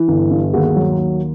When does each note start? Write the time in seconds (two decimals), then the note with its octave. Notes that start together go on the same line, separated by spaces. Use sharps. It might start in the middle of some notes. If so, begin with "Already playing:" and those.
Already playing: E3
0.08 G1
0.31 G2
0.53 D#2 F#4 G#4
0.76 F#3
0.99 D#2